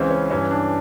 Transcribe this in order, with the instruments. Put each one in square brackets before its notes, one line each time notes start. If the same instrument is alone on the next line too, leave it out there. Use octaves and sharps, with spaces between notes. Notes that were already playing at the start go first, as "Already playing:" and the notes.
Already playing: [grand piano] C#2 C#3 E3 C4
C#4
G2 E3 C#4
D4